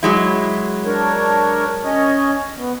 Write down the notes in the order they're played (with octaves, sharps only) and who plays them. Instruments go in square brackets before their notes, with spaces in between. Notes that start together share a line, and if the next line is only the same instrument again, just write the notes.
[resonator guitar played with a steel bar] F#3 G#3 E4
[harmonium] D4 A#4 C#5
C#4 C#5 D#5
B3